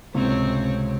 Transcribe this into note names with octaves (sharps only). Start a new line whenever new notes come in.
C#2 A2 C3 C4 C#5